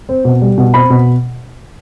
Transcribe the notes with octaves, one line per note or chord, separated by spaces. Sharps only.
C4
B2
G3
B2
C4 B5
B2